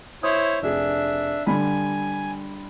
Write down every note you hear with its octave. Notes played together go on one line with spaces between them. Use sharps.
E4 C5 C#5 D#6
F1 D4 G#4 E5
D3 G3 G#5 B5